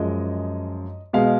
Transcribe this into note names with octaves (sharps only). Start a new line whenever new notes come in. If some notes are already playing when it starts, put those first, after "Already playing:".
Already playing: F#2 F3 G#3 D#5
B2 G#3 F5